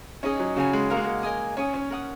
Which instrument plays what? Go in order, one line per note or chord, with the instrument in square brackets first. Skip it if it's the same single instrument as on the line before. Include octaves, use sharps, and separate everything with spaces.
[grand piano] C#4 [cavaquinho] D#4 G#4 D#5 G#5
[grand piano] F#3
[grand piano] C#3 [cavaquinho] F#4 C#5 G#5
[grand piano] G#3
[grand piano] A#3 [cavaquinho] F#4 A#4 D#5 F#5
[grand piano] G#3
A#3
[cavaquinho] A#4 D#5 G#5 D#6
[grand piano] C#4 [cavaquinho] C#5 G#5 D#6
[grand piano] C#4
[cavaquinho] A#4 F#5 D#6